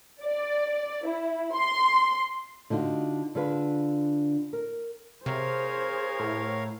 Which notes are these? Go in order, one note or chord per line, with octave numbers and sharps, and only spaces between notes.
D5
E4
C6
D3 D#4 F4 F#4
D3 D4 F4 G#4 B4
A#4
C3 G#4 A#4 C5 C#5 F5
A2